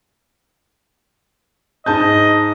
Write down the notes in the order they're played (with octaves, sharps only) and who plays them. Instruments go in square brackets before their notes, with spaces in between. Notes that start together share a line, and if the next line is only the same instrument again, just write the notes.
[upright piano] G#2 A5 G6 [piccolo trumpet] D#5